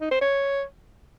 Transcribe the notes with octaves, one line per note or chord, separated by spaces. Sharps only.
D#4
C5
C#5